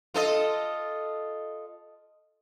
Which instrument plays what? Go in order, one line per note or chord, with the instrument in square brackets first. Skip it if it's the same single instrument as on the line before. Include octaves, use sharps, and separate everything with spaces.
[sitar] F4 A4 D#5